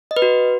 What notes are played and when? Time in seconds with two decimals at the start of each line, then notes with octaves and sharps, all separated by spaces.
0.11 D#5
0.17 B4
0.22 F#4